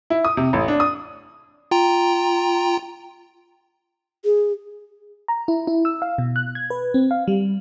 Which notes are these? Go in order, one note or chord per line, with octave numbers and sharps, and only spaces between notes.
E4
D#6
C3
A1
D4
D#6
F4 G5 A#5
G#4
A#5
E4
E4
E6
F5
B2
F#6
G#6
B4
C4
F5
G3